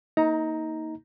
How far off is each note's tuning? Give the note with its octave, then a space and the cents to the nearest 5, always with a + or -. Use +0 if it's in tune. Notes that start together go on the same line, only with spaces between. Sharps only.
A#3 -5 D#4 +25 A#5 +0